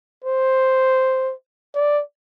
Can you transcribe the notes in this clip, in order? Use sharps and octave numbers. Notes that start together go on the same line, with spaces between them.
C5
D5